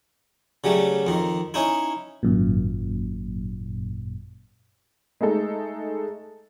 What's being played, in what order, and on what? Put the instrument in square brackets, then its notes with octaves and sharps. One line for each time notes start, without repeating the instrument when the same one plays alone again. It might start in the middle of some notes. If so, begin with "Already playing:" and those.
[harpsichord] C#3 F#3 G3 A3
F2 D#3
C#4 D#4 E4
[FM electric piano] G#1 F#2 A#2
[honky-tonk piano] G#3 A3 D#4 A4